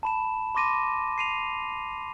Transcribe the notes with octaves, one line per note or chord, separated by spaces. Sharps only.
A5 B5 E7
B5 C6 D6 A#6 D#7
C7 D#7 F7